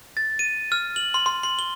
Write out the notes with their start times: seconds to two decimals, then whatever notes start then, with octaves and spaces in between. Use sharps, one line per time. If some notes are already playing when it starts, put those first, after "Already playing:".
0.17 A6
0.39 D#7
0.72 F6
0.96 F#7
1.14 C6
1.26 C6
1.43 C6
1.59 G7